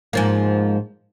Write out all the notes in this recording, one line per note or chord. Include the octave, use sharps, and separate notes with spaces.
G#2 F3 A#3